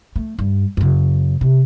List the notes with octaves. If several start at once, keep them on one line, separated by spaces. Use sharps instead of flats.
A3
G2
F#2 C#3
C3